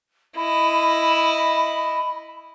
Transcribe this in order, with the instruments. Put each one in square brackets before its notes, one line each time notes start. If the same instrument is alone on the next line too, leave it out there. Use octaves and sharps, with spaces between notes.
[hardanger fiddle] E4 D#5 [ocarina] B5